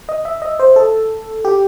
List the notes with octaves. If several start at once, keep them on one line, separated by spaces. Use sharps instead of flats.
D#5
E5
D#5
C5
A4
G4